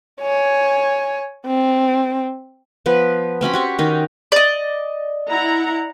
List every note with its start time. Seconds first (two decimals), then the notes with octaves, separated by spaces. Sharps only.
0.21 C#5 G#5
1.46 C4
2.86 F3 B3 B4
3.41 C4 C#4 F#4 B5
3.54 F#4 G4 C#6
3.79 D#3 D#4
4.32 D5 D#5
5.30 E4 F#5 A#5